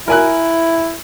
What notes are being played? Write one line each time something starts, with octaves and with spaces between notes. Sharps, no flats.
E4 A#4 G#5 F#6